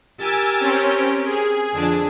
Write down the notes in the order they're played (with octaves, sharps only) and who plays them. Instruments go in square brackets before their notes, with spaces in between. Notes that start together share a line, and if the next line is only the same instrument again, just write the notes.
[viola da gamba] G4 A#4 [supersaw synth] G#5 E6 A6
[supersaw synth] C4 C#4
G#4
[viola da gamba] F2 D3 D4